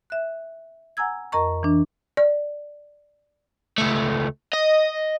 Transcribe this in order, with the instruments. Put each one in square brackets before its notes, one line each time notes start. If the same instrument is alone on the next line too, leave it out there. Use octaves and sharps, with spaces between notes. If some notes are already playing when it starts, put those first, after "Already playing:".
[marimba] E5 F#6
F#5 G#5 A#5 E6 G#6
F2 A#4 D#5 A#5 C#6
E3 D4
[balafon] D5
[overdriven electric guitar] C#2 A3
D#5